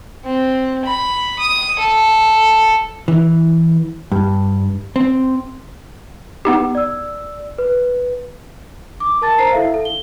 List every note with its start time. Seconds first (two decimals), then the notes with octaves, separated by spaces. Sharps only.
0.25 C4
0.85 B5
1.39 D#6
1.79 A4
3.08 E3
4.12 G2
4.96 C4
6.45 B3 D#4 G4
6.75 D5 E6
7.58 B4
9.00 D6
9.22 A#4 A5 A6
9.38 C5 A#5 C7
9.52 E4 A4 E5 F5
9.74 A4
9.85 G7